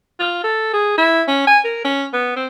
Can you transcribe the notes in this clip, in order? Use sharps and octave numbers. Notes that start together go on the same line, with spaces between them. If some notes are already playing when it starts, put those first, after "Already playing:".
F4
A4
G#4
E4
C#4
G#5
A#4
C#4
B3
C4